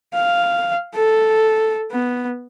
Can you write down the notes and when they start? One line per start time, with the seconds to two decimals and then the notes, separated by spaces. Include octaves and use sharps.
0.14 F5
0.94 A4
1.91 B3